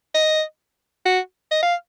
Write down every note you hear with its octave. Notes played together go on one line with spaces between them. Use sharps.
D#5
F#4
D#5
F5